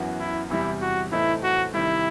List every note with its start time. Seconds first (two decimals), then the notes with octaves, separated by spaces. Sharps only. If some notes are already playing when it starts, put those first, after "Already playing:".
Already playing: F#2 E3 B3 F#4
0.20 E4
0.50 E2 C3 E3 G3 E4
0.81 F#4
1.12 A2 E3 A3 C4 D#4 E4
1.43 F#4
1.74 C3 D#3 G3 E4